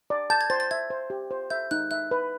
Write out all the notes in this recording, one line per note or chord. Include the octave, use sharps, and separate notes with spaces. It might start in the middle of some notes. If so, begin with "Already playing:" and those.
D5
A5 G6
G#6
C5 A6
A6
E5 G#6
C5
G4
C5
E5 G6
D#4 F#6
E5 F#6
B4